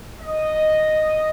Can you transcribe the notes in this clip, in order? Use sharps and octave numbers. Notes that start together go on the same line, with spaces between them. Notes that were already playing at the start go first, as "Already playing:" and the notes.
D#5